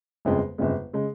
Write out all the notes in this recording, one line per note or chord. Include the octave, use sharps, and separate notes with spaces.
G1 F2 C#3 G#3
G1 F2 C#3 G#3
C#3 G#3